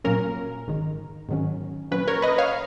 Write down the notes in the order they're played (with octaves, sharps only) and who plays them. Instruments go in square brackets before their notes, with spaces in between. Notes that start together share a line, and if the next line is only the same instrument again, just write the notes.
[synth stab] A#2 F#3 A#3 C#4 A#4
G#1 G#2 D#3
G#2 D#3 F#3 C#4
A#2 F#3 C#4 B4
A#4 C#5
B4 D#5
C#5 F5